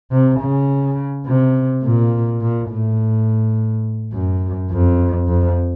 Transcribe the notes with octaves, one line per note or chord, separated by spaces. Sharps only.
C3
C#3
C3
A#2
A#2
A2
F#2
F2
F2